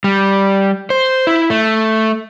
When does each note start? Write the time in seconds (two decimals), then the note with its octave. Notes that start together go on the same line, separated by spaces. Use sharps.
0.04 G3
0.90 C5
1.27 E4
1.50 A3